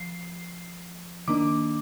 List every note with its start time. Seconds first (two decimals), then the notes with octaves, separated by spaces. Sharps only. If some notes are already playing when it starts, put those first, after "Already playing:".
Already playing: F3 C7
1.28 D#3 A#3 D4 D6